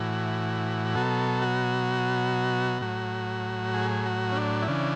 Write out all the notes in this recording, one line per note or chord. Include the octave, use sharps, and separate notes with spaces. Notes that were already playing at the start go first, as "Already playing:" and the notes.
Already playing: A2 E3 F#4
B2 F#3 A4
F#4
A2 F#3
G#4
F#4
C#4
D4
E4
C#3 E3 D4